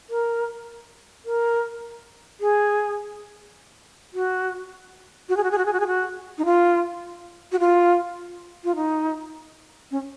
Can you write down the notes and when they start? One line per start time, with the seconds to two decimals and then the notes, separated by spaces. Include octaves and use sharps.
0.10 A#4
1.25 A#4
2.40 G#4
4.14 F#4
5.29 F#4
5.37 G#4
5.43 F#4
5.51 G#4
5.58 F#4
5.66 G#4
5.73 F#4
5.80 G#4
5.87 F#4
6.38 D#4
6.45 F4
7.52 F#4
7.60 F4
8.64 F4
8.76 D#4
9.91 C#4